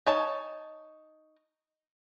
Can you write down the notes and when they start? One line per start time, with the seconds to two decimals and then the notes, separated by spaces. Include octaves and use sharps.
0.06 D#4 C#5 A5